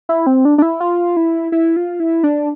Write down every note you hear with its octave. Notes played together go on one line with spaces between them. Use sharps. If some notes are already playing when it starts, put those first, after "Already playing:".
E4
C4
D4
D4
E4
F4
E4
E4
F4
E4
D4